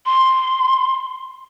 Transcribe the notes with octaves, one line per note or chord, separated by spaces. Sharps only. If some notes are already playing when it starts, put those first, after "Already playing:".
C6